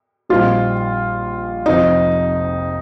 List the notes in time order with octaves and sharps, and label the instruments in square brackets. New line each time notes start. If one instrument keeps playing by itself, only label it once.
[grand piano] A#1 A#2 G3 C4 D#4 [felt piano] F4
[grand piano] F1 F2 F3 C4 F4 [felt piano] D#4